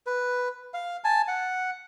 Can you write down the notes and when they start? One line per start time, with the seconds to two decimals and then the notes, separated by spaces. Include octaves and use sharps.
0.06 B4
0.74 F5
1.04 G#5 A5
1.28 F#5